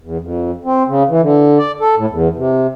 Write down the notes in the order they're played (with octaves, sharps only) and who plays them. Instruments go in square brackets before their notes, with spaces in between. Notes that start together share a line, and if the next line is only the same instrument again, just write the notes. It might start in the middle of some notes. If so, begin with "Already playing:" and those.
[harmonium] E2
F2
C4
C#3
E3
D3
D5
A4
A2
E2
C3